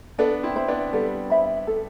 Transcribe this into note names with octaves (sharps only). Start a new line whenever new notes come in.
B3 D4 A4
C4 E4
C5 E5 B5
B3 D4
G3 B3 A4
C5 E5 B5
A4